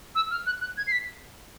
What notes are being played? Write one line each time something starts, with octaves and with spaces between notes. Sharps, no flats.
E6
F6
F#6
F#6
G#6
C7
B6